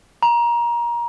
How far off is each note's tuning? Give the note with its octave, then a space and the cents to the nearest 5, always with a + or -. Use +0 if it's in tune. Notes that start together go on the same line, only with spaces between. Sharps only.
A#5 +25